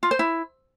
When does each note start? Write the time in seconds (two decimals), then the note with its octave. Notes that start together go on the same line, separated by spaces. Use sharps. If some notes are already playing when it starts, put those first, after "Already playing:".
0.03 F4
0.11 C5
0.19 E4